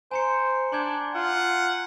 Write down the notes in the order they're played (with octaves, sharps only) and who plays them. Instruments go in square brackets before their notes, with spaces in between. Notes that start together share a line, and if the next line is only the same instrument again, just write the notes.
[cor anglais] C5 [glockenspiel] G#5 A#5 C#7
[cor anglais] D4 [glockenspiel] C6 G6 G#6
[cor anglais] F4 [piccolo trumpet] F#5